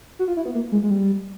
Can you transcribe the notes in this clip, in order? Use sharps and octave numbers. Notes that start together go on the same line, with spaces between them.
F#4
F4
E4
B3
A#3
G#3
G#3
G3